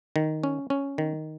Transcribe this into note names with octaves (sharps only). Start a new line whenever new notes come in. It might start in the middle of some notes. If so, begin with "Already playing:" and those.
D#3
C#4
C#4
D#3